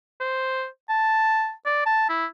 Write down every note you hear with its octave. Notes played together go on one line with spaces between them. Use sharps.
C5
A5
D5
A5
E4